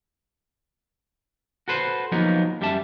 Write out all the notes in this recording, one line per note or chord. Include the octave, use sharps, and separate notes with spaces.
F#4 A4 B4 C5
F3 F#3 A#3 B3 D#4
F#2 G3 G4 E5 A5